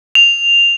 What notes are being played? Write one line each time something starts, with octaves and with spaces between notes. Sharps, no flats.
F7